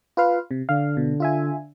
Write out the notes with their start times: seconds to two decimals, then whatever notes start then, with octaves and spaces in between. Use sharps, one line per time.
0.17 F4 B4 F5
0.51 C3
0.69 D3 F5
0.97 B2
1.20 F4 E5 G#5